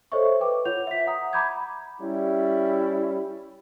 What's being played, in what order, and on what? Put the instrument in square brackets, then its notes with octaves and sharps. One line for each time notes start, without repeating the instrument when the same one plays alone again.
[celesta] A4 C5 C#5 D#5 E5 C#6
B4 G5 D6
F4 C#5 F#5 G6 F7
E5 B6
E5 F#5 A#5 D#6
A#5 B5 D6 G6 G#6
[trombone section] G3 C#4 E4